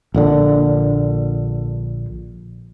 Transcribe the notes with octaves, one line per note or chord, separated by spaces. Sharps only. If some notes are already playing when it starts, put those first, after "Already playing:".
A#1 A#2 D3